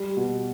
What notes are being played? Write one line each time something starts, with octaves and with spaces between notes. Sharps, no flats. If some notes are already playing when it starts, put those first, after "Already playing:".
Already playing: G3
B2